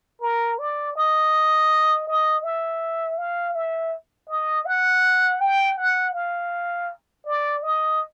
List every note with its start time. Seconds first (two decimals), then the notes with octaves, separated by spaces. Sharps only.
0.22 A#4
0.59 D5
0.96 D#5
2.07 D#5
2.43 E5
3.18 F5
3.55 E5
4.29 D#5
4.66 F#5
5.40 G5
5.77 F#5
6.14 F5
7.25 D5
7.63 D#5